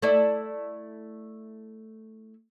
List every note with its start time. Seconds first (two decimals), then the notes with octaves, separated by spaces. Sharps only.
0.02 A3 E4 D5